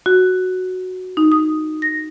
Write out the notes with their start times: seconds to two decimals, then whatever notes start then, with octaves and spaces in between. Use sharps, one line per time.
0.06 F#4
1.17 D#4
1.32 D#6
1.82 A#6